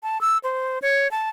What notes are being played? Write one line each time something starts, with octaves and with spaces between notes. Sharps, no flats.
A5
E6
C5
C#5
A5